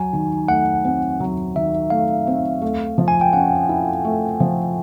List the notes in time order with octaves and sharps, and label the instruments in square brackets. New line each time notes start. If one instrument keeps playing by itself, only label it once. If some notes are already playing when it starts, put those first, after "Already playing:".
Already playing: [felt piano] F#3 [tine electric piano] G#5
[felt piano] D#3
[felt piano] A3 [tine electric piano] F#5
[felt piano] C4
F#3
[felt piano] D#3 [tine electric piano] E5
[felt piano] A3 [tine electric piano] F5
[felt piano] C4
A3
F3
[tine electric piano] G#5
G5
[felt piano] C#4 [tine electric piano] F#5
[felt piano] E4
A3
F3